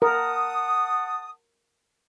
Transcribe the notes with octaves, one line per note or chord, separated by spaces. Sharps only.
A#4 F#5 A5 D#6